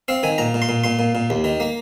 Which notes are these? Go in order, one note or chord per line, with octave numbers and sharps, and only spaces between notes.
C4 F5
D#3 G#5
A#2 A#5
A#2
C6
A#2
A#2 C6
A#2
A#2
D#2
D#3
A#3